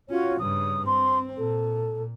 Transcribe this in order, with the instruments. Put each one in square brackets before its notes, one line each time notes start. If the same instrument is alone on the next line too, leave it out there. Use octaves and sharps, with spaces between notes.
[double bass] C#4 [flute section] F4 F#4 C#5
[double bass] G2 C#3 [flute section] D#6
[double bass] C4 [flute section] C6
[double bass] A#2 [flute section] A4